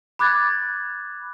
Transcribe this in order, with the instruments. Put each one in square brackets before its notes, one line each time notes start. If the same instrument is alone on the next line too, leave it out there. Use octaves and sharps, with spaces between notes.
[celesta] B5 D6 F#6 G#6 A6